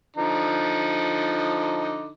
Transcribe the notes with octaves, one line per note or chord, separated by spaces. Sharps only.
D3 F3 D#4